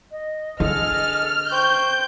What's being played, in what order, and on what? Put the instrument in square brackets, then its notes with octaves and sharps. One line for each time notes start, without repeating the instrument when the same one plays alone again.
[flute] D#5
[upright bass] D3 [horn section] G#4 A4 [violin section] F6
[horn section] C5 G5 [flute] C#6 [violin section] G6